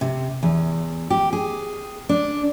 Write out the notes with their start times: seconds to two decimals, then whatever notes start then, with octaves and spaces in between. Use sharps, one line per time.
0.01 C3
0.43 E2
1.10 G4
1.33 G#4
2.09 D4